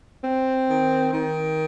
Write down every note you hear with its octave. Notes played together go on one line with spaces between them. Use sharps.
C4
D#3
D#3